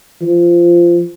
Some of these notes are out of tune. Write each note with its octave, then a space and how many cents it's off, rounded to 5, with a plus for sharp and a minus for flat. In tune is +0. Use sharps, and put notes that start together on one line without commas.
F3 -15